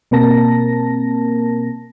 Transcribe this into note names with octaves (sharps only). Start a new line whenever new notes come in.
B2 A#3 C4 A#4 A5 A#6